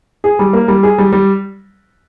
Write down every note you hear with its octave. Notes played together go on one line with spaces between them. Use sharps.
G#4
G3
A#3
G3
G#4
G3
G3